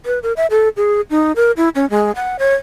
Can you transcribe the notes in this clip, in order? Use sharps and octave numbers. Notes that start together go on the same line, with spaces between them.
B4
A#4
E5
A4
G#4
D#4
A#4
E4
C#4
G#3
F#5
C#5